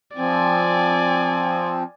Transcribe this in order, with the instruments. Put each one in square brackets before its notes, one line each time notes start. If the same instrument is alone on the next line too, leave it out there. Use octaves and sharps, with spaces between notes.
[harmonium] F3 C4 [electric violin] D5 G#5